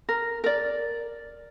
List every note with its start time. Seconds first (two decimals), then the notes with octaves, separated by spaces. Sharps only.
0.09 A#4
0.44 A#4 D5